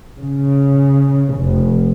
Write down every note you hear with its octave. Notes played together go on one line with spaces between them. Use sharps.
C#3
F1